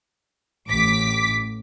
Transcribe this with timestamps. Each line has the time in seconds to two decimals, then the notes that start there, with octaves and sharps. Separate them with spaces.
0.66 A1 D6 B6